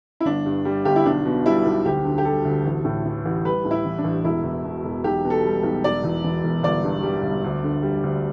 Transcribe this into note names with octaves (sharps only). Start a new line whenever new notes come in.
E4
G1 D4
G2
G3
G1 G4
E4
B1 D4
B2
G3 E4
B1
D2 G4
D3
G4
G3 A4
D2
A1
A2
E3
A1
G3 B4
A2
E4
E3
D4
A1
E1 E4
E2
B2
E1
B1 G4
B2
A4
G3
B1
E1 D5
E2
E3
E1
G1 D5
G2
G3
G1
D2
D3
G3
D2